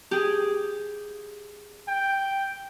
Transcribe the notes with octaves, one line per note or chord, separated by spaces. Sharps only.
G4 G#4
G5